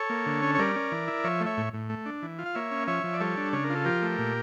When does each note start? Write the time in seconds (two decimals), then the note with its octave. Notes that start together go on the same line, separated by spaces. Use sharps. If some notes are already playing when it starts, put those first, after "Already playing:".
Already playing: A4 C#5
0.10 A#3
0.26 D3
0.42 C#4
0.55 C#5
0.59 G3 A#4 D5
0.76 C#4
0.92 E3
1.08 E4
1.24 F3 C#5 E5
1.40 A3
1.46 C#5 E5
1.57 A2
1.73 A2
1.90 A3
2.06 D4
2.23 E3
2.39 F4
2.46 F5
2.55 A#3 C#5 E5
2.71 C#4
2.87 F3 C#5 E5
3.04 F3
3.14 D5
3.20 G3 A4 C#5
3.37 D4
3.53 C#3 C#5
3.64 A#4
3.70 F4 A4
3.85 F3 G4 A#4
4.02 A3
4.18 A#2